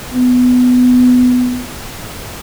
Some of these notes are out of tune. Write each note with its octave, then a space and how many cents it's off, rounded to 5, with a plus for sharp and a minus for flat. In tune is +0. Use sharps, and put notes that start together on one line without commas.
B3 +15